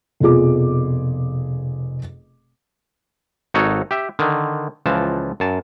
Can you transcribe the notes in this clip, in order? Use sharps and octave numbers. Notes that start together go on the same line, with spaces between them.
F1 B2 F3 F4 G#4 D6
G#1 D#4 F#4 A4 C#5
G4 E5
D3 D#3
C#2 E3 F3 A5
F#2 A5